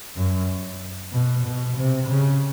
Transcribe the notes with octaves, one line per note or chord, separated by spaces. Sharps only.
F#2
B2
B2
C3
C#3